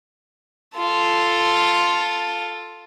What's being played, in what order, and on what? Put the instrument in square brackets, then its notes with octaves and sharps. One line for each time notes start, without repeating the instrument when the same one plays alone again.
[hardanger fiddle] F4 A4